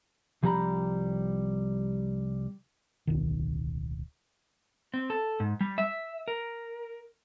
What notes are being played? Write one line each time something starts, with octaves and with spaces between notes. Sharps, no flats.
C2 F3 G3 G4 A#5 B5
D1 B1 D#3
C4
A4
G#2
G3
E5
A#4